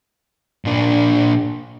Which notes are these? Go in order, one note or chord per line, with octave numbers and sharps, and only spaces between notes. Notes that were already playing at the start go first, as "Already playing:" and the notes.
A#2 D4